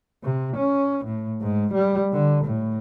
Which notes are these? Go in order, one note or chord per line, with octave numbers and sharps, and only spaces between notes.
C3
C#4
A2
G#2
G3
D3
A2